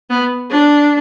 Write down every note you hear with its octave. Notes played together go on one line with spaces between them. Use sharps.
B3
D4